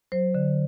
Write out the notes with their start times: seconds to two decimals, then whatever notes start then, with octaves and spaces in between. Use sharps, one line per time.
0.12 F#3 C5
0.35 D3